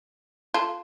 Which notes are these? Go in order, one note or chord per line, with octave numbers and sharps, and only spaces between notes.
F4 A4